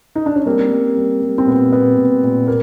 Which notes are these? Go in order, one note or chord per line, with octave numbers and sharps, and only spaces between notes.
D#4
D4
C#4
G3 A#3 C4
G3
G3
G3
C4
A#2 B3
A#2 B3
A#2
A#2
A#3